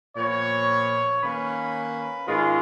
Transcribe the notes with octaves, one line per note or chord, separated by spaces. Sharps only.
A#2 F3 B3 C#5
D#3 A#3 C#4 B4
G#2 D#3 G#3 C#4 F4